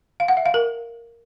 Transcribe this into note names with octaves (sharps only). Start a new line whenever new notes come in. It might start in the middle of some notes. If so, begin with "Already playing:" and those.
F5
F#5
E5
F5
A#4